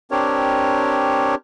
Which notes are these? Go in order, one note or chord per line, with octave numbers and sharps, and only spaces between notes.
C4 D4 G4 A#4 C#5